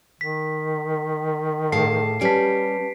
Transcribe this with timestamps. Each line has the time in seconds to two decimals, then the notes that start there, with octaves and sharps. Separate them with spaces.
0.21 D#3 B6
1.72 A2 G#4 A4 F5 A5 C7
2.21 G3 C#4 G4 B4 A5 B6 D7